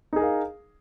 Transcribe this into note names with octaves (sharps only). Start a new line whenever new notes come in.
D#4 G#4 A#4 F5